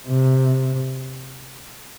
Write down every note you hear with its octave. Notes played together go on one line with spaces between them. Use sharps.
C3